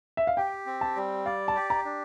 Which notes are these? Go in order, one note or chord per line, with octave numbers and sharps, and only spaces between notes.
E5
F5
G4 G5
C4
A5
G3
D5 F5
A5
G4
A#5
D4